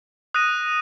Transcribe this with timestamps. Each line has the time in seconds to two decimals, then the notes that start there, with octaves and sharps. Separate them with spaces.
0.34 D#6 F#6 A#6 D#7